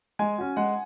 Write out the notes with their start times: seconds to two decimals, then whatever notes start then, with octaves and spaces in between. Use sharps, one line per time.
0.19 G#3 G#5
0.38 C#4 F#4
0.56 G#3 F#5